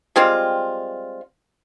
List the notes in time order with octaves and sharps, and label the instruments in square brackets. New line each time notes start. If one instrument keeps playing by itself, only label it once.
[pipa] G3 G#3 C4 F4